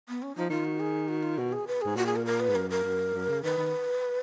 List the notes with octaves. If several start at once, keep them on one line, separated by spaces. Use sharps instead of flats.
B3
C#4
F3 D#4
D#3 F4
F#4
G#4
F#4
F4
B2 F#4
G#4
B4
G#2 G#4
A#2 F#4
G#4
A#4
A#4
B4
G#2
F#2 A#4
A#4
F#2
F#2
C#3
D#3 B4
D#3